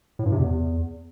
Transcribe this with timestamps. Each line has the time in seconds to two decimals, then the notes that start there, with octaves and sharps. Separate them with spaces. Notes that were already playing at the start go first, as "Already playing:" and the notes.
0.19 A2
0.26 G2
0.32 C3
0.39 E2